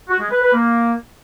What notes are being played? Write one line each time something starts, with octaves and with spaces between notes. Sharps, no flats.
F#4
G#3
B4
B4
A#3